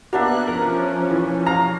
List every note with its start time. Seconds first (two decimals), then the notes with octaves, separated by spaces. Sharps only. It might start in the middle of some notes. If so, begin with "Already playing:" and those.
0.13 A#3 B3 D4 F#4 E5 F#6
0.47 F3 C#4 A#4
1.11 E3
1.46 F5 A#5